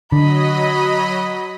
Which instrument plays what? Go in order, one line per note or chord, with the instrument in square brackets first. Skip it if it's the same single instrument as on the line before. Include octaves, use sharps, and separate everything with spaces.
[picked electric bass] D3 [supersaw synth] F#3 D#5 [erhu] B5